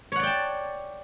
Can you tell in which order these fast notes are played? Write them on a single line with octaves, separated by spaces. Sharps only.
C#5 F#5 D5 G5 A5